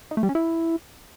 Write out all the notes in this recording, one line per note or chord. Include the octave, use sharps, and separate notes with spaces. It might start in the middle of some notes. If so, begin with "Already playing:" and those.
D#4
A3
G3
C#4
E4